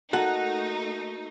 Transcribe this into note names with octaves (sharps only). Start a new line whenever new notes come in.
A3 A#3 D#4 F#4 A4 F#5